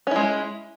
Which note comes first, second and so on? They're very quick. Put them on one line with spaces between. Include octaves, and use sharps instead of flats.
C#4 E4 G#3